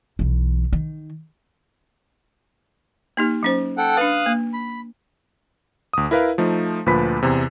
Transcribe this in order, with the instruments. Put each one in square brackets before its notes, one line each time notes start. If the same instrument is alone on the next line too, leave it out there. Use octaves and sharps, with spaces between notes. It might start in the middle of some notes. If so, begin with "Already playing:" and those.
[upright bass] B1 E3
D#3
[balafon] A#3 D#4 G4
F#3 C#4 C5
[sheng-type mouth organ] A4 F#5 G5
[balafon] D4 B4 [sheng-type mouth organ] F5 D#6 F#6
[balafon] A#3
[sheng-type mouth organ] B5
[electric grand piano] D2 D#6
E4 A#4 B4 F5
F3 A3 D#4
D2 A#2 F3 B4 B5 B6
E2 C3